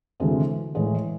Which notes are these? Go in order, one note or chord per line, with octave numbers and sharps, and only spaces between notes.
D2 C3 E3 G#3
A2 E3 G#3